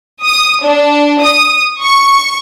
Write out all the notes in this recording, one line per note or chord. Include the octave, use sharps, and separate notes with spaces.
D#6
D4
D#6
C#6